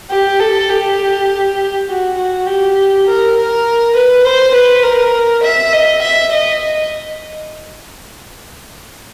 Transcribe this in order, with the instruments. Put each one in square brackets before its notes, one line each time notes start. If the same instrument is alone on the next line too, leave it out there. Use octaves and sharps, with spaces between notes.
[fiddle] G4
A4
G4
F#4
F#4
G4
A#4
A#4
B4
C5
B4
A#4
E5
D#5
E5
D#5